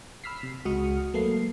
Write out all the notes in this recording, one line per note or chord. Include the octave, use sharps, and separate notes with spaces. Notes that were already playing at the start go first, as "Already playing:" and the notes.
B5 E6 F6 B6 C7
C3
C#2 G#3 F#4 D#6 F6 C#7
F#3 A3 A#3 A4 B4 C7